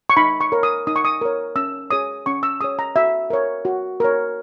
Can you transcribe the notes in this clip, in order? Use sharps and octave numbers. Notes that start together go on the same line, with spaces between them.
C#6
D#4 B5
C#6
A#4 C#5
D#6
D#4 D#6
C#6
D#6
A#4 C#5
C#4 E6
G#4 C#5 D#6
C#4 C#6
E6
G#4 C#5 D#6
A#5
F#4 E5
A#4 C#5
F#4
A#4 C#5